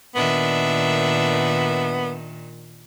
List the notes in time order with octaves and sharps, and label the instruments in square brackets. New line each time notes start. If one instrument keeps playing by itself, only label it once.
[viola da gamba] A#2 D#3 [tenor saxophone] B3 [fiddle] D4 E5